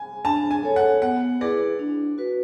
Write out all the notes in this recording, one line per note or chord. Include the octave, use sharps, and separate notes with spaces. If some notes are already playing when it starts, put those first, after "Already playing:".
Already playing: G#5
D4 A5
G#5
A4 C#5
F#5
B3 F#5
E4 G#4 B4 D5
D4
F#4 B4